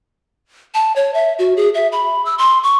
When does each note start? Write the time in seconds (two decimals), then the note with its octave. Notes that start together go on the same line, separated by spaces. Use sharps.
0.74 A5
0.96 C#5
1.14 E5
1.39 F#4
1.57 G#4
1.74 E5
1.92 B5
2.25 E6
2.38 C6
2.63 C#6